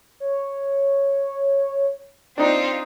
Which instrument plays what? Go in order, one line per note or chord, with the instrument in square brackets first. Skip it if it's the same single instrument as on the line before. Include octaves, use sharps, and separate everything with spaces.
[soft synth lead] C#5
[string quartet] C4 F4 [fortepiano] D4 D#4 [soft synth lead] D#5